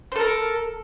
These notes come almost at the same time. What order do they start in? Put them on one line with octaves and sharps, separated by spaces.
C5 A4 A#4